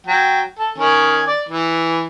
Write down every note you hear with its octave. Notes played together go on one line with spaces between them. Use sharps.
F#3 G5
A4
D#3 C#4 G#5
D5
E3